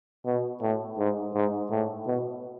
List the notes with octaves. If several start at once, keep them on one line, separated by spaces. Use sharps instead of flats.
B2
A2
G#2
G#2
A2
B2